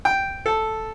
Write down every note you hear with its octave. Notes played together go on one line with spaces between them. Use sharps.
G5
A4